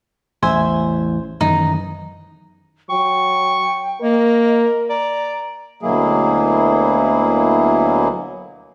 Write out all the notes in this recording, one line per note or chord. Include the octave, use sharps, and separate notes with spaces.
A1 E2 C5 E5 G#5
F#2 D#3 E3 D#4
F#3 G5 C#6
A#3 A#4 D#5
D5 A#5
D2 B2 F#3 A#3 E4 G#4